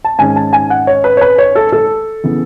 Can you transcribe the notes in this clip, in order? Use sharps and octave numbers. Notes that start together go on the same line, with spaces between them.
A5
G#2 D#3 G#3 C#4 G#5
A5
G#5
F#5
C#5
B4
C#5
B4
C#5
A4
A4
C#3 E3 B3